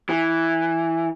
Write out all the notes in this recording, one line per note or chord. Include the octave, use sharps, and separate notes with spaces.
E3